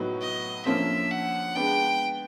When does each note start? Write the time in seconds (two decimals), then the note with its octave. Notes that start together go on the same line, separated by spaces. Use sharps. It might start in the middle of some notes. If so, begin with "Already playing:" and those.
Already playing: A2 F#3 B3 D#4 F#4
0.21 D#5
0.66 D3 F3 A#3 C#4 F4 E5
1.11 F#5
1.55 G#3 B3 D4 G5